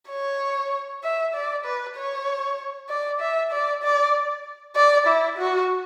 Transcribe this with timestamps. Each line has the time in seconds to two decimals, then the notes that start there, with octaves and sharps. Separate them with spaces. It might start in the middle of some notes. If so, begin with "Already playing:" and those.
0.10 C#5
1.04 E5
1.34 D5
1.65 B4
1.96 C#5
2.89 D5
3.21 E5
3.52 D5
3.83 D5
4.76 D5
5.07 E4
5.38 F#4